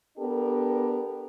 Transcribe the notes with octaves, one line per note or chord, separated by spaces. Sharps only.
B3 D4 G4 A4 A#4